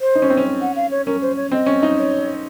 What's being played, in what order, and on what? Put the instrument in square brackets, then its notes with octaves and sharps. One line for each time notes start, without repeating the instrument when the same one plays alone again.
[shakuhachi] C5
[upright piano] D#4
C#4
C4
C#4
[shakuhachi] F#5
F5
C#5
[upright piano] C#4 [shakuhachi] A#4
[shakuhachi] C5
C#5
[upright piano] C4 [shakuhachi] D#5
[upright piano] C#4
D#4
[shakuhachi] C#5